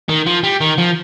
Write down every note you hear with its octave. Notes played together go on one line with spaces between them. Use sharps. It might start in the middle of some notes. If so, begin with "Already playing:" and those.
D#3
F3
G3
D#3
F3